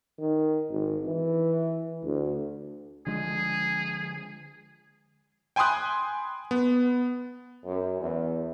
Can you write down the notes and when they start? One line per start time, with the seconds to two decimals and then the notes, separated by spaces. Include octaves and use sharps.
0.19 D#3
0.70 G#1
1.06 E3
2.04 D2
3.07 D3 F3 G#3 G#4
5.56 G5 G#5 B5 C6 D#6 F#6
6.51 B3
7.65 F#2
8.01 E2